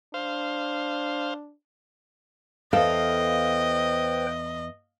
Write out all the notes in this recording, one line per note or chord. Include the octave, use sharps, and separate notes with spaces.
D4 C5 F5
E2 A4 B4 C5 D#5 F5 G5